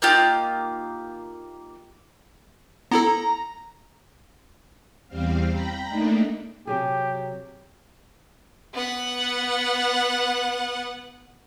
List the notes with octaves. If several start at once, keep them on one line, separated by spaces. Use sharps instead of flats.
A#3 D#4 F4 G4
B3 E4 A4 A#5
E2 G3 C4 F5
G5 A#5 B5
A3 A#3 D4 D#4
C3 F#3 G4 G#4
B3 F#5